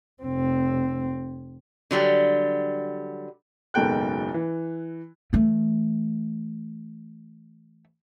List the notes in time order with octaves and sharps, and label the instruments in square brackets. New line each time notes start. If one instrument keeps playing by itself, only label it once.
[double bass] F1 C4
[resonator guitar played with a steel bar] D3 F#3 G3
[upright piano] F#1 G#2 B2 A4 G5 F#6
E3
[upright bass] E3 A3